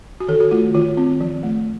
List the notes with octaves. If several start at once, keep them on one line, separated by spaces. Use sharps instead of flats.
F#4
D#3 A4
F#4
A3 F4
D#3 F4
C4
F3
A3